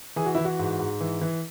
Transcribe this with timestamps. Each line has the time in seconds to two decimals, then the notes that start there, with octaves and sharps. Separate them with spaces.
0.16 E3 G#4
0.26 F#4
0.35 E3 E4
0.45 F#4
0.59 G#2
0.79 G#2
1.01 E3
1.21 E3